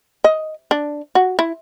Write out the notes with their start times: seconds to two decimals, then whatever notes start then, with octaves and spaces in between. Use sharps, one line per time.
0.24 D#5
0.71 D4
1.15 F#4
1.39 E4